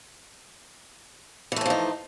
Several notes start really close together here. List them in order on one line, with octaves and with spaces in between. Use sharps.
E3 A3 C#4 F3 D#4